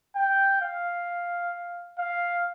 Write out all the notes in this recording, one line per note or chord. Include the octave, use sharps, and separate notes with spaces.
G5
F5
F5